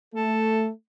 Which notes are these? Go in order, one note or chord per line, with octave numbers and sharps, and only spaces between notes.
A3 A4